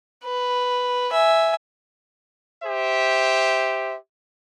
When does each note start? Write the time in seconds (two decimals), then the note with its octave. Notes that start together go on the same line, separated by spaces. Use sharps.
0.24 B4
1.12 E5 G#5
2.64 G4 C5 E5